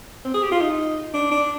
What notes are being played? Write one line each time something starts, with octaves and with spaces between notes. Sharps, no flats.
C4
G#4
G4
F4
D#4
D4
D4